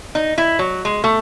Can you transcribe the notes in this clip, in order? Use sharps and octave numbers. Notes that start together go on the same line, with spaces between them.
D#4
E4
F#3
G#3
A3